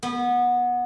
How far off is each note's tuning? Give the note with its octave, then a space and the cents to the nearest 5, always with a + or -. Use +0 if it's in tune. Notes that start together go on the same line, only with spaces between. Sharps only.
B3 -20